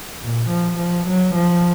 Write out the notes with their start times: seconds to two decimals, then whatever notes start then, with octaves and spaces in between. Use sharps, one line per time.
0.22 A#2
0.50 F3
0.78 F3
1.07 F#3
1.35 F3